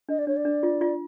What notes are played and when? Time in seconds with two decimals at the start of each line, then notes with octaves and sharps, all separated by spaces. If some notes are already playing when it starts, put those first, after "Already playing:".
0.09 D4 D#5
0.18 D5
0.27 D4 C#5
0.36 D5
0.45 D4
0.63 F4
0.81 F4